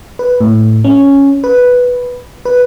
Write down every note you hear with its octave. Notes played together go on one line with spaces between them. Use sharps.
B4
A2
C#4
B4
B4